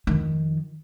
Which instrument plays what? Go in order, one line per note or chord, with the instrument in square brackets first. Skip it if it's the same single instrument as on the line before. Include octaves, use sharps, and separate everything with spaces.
[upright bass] F2 D#3